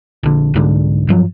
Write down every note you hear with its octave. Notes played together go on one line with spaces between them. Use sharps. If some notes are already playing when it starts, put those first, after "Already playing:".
A#1 D3
C2 G#2 D3
G2 F3 F#3